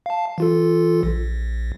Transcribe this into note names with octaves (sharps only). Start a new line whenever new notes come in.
F5 A5
E3 F4 A4
A#1